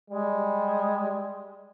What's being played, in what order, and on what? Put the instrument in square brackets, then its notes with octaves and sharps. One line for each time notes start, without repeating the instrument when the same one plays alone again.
[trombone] G3 [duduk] G#3